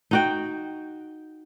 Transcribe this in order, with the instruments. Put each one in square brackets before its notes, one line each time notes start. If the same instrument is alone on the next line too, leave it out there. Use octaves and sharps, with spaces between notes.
[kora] D#4 F#4 G5